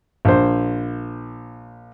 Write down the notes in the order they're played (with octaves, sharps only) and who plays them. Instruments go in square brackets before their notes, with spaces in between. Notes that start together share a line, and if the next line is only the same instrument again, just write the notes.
[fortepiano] A#1 C5